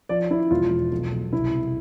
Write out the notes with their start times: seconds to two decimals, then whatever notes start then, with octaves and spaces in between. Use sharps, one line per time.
0.09 F3 D5
0.30 F3 E4
0.51 E1 F4
0.71 E2
0.92 B1
1.12 B1
1.33 C2 E4
1.53 C2